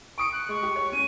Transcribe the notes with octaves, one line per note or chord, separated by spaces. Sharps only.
C#6 D#6 C#7 D7
F#6
G#3 C#6
G4
C#5
C#4 D#7